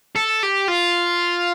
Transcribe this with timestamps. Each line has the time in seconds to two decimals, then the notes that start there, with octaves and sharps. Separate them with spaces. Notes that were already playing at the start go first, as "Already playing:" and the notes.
0.16 A4
0.43 G4
0.68 F4